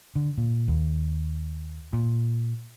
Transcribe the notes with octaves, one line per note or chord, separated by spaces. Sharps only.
D3
A#2
D#2
A#2